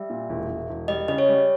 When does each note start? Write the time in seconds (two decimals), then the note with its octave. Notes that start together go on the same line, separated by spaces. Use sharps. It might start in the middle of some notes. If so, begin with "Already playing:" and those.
Already playing: G3 E5
0.10 A#2
0.30 E1
0.49 E1
0.70 E1
0.88 G3 D#5
1.08 C#3 D#5
1.18 C#5
1.29 G3